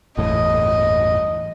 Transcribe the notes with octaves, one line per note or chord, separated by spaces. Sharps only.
G1 E2 A2 D#5